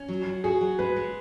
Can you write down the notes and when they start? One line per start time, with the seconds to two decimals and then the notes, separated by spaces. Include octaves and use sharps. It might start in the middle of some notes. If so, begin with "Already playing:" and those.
Already playing: C#4
0.08 F#3
0.26 F#3
0.44 F#4 G#4
0.61 F#3
0.79 G#3 B4
0.96 G#3